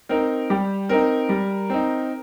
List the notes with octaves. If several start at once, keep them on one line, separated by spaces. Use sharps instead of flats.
C4 D#4 A#4
G3 G4
C4 D#4 A#4
G3
C4 D#4